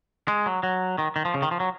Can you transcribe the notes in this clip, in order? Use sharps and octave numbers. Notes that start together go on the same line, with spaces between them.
G#3
F#3
F#3
D#3
D#3
F3
C#3
D#3
F3
F#3